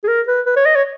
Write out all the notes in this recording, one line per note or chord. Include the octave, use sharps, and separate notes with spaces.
G#4
A#4
B4
B4
C#5
D#5
C#5